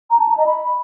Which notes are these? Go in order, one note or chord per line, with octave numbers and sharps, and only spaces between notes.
A#5
A5
A#5
D#5
B5